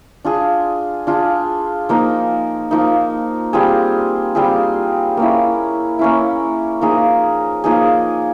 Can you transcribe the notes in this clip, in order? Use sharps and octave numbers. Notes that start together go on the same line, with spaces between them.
D4 F4 G#4
D4 F4 G#4
F3 A#3 D#4
F3 A#3 D#4
G3 C4 F4 G#4
G3 C4 F4 G#4
A#3 C#4 E4
A#3 C#4 E4
F3 A#3 D#4 G#4
F3 A#3 D#4 G#4